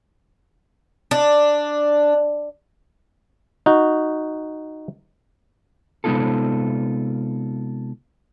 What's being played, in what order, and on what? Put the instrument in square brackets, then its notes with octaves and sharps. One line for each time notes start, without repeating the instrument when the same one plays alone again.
[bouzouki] D4
[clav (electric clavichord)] D#4 F#4
[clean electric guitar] C3 G#3 B3 D#4 F4 A4